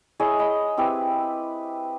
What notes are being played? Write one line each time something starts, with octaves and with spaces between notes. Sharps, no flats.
E4 G#4 C#5 D#5
D#5 B5 D#6
C4 E4 G4 B4